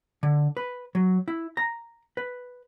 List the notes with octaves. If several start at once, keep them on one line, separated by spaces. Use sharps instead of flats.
D3
B4
F#3
E4
A#5
B4